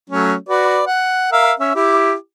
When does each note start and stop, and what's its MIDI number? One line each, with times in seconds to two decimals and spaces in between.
0.10 0.34 54
0.10 0.34 57
0.10 0.34 61
0.49 0.82 66
0.49 0.82 71
0.49 0.82 74
0.87 1.27 78
1.32 1.52 70
1.32 1.52 76
1.32 1.52 77
1.60 1.71 61
1.60 1.71 76
1.75 2.13 64
1.75 2.13 67
1.75 2.13 86